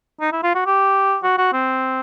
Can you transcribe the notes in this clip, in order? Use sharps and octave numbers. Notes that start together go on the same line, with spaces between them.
D#4
E4
F4
F#4
G4
F#4
F#4
C4